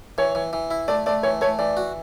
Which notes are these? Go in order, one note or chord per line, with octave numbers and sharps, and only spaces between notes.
E3 C#5
E3
E3
E4
A3 D5
A3 D5
E3 C#5
A3 C#5
E3 D5
F#4